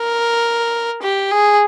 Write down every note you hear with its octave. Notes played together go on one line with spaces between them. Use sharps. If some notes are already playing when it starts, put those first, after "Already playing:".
Already playing: A#4
G4
G#4